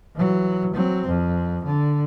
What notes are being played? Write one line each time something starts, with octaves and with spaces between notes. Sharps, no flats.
E3 F#3
F#3 C4
F2
D3